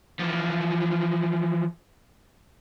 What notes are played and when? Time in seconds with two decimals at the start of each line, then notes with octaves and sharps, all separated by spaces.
0.19 E3 F3